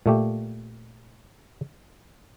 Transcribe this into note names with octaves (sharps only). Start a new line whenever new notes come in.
A#2 A3 G4